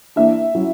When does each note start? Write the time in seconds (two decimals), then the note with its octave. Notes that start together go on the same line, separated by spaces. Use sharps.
0.16 E3 A#3 D4 E5
0.54 F#3 C#4 E4